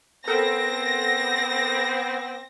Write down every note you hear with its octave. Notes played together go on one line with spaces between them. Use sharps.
B3 C4 A4 A#4 G6 A#6